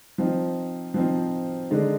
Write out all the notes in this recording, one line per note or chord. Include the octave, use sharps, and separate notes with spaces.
F3 C4 D#4
F3 C4 D#4
D3 G#3 D#4